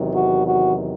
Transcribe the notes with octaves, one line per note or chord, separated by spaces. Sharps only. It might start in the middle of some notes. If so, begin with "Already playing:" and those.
Already playing: E2 C3 D#3 F#3
F#4
F#4